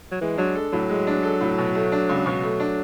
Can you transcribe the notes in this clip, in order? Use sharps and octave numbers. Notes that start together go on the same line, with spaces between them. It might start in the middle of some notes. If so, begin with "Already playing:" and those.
F#3
E3 G#3
F#3 D4
A4
A2 F#3
G#3
D4
A4
A2
B2
A3
D4
C#2
B2 F#3
A3
D4